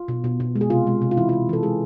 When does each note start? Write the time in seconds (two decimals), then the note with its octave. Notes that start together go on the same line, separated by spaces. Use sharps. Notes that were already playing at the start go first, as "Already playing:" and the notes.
Already playing: F4
0.08 B2
0.24 B2
0.40 B2
0.56 G#3
0.61 G#4
0.70 C3 F4
0.87 G#3
1.02 C3
1.11 F4
1.17 E3 E4
1.29 C3 F4
1.49 E3 A4
1.63 G#3 G#4